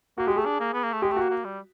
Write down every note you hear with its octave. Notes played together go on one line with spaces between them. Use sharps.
A#3 F#4
G#3 G4
A3 G#4
D4
A#3
B3
A#3
A3
G#3 G4
A3
A#3 F#4
A#3
G3